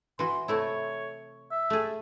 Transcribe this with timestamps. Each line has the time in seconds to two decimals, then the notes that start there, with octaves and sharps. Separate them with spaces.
0.19 E3 F#4 C6
0.48 C3 A3 E4 C#5
1.51 E5
1.70 A3 G#4